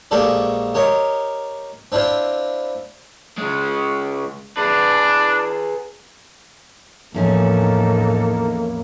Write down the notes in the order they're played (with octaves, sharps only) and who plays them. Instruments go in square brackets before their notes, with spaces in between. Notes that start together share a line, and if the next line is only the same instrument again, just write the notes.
[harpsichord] A#1 G#3 A#3 G4 A4 D5
G4 A#4 C#5 D#5
C4 D4 E4 F4 C5
[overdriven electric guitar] C#3 G#3
[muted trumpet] D4 [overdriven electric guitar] G#4 B4
[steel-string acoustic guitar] E2 F3 C#4 [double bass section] A2 E3 [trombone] A#3 [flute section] D#4 A4